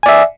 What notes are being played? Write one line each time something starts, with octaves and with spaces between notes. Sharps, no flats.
D5 E5 G#5